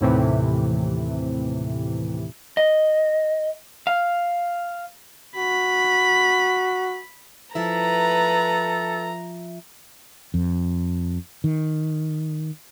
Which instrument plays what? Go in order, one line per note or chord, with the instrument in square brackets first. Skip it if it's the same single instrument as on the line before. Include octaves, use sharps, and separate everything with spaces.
[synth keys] D#2 A2 C3 E3
[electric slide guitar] D#5
F5
[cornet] F#4 [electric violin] B5
[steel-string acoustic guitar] F3 E4 E5 [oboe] A4 [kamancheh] B4 [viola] A#5
[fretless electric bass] F2
D#3